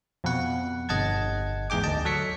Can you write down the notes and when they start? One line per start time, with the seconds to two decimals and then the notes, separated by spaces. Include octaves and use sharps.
0.24 F2 B2 F#5
0.89 G1 D#5 F#5 A5 G#6
1.70 E2 G#2 G#4 G5 D6
1.84 D2 D#5 A5
2.05 F#3 A4 B6 C#7